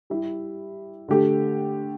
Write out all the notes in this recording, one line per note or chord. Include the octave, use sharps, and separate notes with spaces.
G3 E4 G4
D3 A3 G4